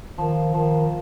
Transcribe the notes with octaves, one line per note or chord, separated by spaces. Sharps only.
D#3 F3
D#3 F3